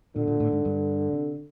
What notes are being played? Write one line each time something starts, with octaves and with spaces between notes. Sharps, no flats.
A#2 D3
A#2
A2
G#2
G2
C3